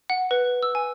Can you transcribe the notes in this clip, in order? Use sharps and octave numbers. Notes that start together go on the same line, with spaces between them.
F#5
B4
E6
G#5